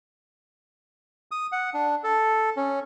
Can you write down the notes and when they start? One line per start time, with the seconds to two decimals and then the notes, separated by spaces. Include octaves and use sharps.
1.31 D#6
1.52 F#5
1.74 D4
2.04 A4
2.56 C#4